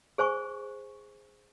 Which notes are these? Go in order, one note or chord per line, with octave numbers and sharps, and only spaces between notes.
G#4 C5 G#5 C#6